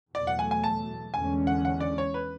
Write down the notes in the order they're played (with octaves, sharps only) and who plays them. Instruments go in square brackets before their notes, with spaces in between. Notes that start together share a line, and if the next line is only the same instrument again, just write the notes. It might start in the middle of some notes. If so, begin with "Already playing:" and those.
[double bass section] E2 B2 F#3 A3 [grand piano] D5
[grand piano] F#5
G#5
G#5
A5
[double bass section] E2 D3 G#3 C#4 [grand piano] G#5
[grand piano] F#5
F#5
D5
C#5
B4